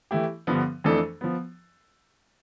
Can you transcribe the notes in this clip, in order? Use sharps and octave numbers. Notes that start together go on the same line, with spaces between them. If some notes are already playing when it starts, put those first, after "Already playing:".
E3 A3 E4 G4
G2 D3 F3 B3
F2 E3 A3 D4 A4
F3 B3